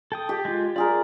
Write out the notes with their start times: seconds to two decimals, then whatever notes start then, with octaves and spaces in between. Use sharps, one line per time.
0.12 A4 G5 D#6
0.29 G4
0.45 G#3 F4
0.76 F4 G#4 A#4 D5